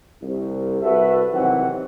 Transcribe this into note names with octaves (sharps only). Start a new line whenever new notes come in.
C2
C2 F#4 A4 B4 E5
C3 D#3 E3 F#3 C4 F#5